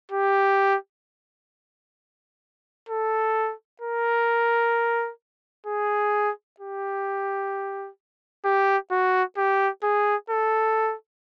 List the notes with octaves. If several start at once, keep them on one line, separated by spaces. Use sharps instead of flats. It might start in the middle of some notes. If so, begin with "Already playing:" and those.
G4
A4
A#4
G#4
G4
G4
F#4
G4
G#4
A4